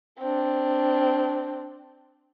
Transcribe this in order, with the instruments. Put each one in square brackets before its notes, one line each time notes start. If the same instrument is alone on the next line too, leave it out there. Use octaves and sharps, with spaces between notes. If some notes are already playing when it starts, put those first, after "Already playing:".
[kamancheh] C4 D4